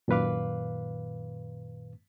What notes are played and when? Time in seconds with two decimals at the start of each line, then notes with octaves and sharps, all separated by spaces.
0.08 F#2 A#2 D#3 B4 F5 D6